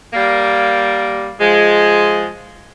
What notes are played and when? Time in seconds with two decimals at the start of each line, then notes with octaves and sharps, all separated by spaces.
0.13 G3 A#3
1.40 F3 G#3